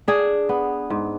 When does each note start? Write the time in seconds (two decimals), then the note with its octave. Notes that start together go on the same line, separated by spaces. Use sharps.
0.08 D4 G#4
0.49 B3
0.90 G#2